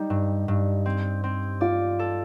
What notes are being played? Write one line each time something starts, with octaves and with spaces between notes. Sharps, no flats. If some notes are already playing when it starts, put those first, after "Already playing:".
Already playing: G3 D#4
G2
G2
C4
C4
F4 D5
A4